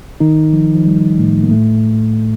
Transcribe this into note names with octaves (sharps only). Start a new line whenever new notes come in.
D#3 D#4
F3
F3
G3
A2 A3
A#3
A2 A3